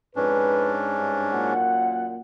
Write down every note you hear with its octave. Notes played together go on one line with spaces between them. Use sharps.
F2 G#2 C#4 D4 B4
G2
F#2 A#2 F#5